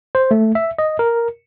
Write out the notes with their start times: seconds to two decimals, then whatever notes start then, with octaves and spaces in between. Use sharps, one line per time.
0.15 C5
0.31 A3
0.55 E5
0.78 D#5
0.99 A#4